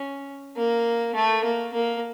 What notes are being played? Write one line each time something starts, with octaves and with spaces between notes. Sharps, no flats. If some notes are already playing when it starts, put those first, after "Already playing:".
Already playing: C#4
A#3
A3
A#3
A#3